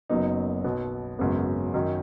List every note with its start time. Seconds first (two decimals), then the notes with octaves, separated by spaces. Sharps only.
0.10 F#1 F#2 F#3 B3 D#4
0.64 B1 B2 B3
1.19 G#1 F#2 C#3 B3
1.74 F#2 D#3 F#3 D#4